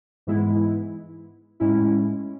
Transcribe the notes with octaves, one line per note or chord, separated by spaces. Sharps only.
G#2 E3 G#3 B3 E4
A2 G#3 C#4 E4